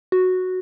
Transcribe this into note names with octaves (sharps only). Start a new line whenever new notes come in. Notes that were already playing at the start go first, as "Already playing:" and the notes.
F#4